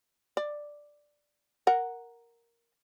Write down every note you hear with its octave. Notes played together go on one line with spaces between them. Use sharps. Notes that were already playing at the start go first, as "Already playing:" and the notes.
D5
A#4 F#5